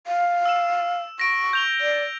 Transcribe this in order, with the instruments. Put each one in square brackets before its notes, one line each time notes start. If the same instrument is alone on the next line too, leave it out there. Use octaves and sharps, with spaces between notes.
[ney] F5
[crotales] E6 E7
[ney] C#6 [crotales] A#6 D7
[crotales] G6 F7 G7
[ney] D5